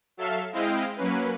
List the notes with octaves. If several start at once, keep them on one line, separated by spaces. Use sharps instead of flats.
F#3 A4 E5 F5
G#3 C4 E4 D#5 F5 G5
F#3 A#3 C#4 B4